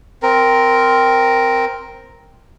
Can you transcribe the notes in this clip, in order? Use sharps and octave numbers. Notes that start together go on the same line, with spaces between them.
C4 A#4